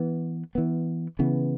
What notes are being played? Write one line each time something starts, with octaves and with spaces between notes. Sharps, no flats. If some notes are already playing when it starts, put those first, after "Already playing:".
Already playing: E3 B3
E3 B3
C#3 E3 B3